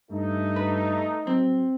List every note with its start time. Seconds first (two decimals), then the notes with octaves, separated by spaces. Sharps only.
0.11 G2 A3 D#4
0.56 B4
1.27 F#3 C4